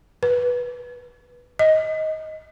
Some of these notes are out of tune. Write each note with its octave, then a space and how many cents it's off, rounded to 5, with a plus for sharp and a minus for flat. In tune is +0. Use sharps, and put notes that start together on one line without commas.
B4 -10
D#5 +15